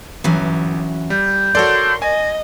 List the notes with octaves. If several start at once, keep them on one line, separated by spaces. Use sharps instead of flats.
G1 E3 F#3 C#4
G3 G6
F#4 A4 A#4 C#5 D5 C6
D#5 G#5 A#6